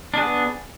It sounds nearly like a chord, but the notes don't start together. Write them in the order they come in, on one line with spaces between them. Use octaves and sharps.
D4 G#4 B3